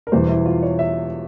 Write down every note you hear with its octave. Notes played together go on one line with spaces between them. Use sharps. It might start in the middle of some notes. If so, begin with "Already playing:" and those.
A#4
E1 E2 E3 G3 C5
E4
F4
C#5
E5